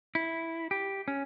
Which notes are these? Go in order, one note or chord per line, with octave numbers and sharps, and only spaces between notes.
E4
G4
C#4